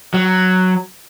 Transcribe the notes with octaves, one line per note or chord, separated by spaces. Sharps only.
F#3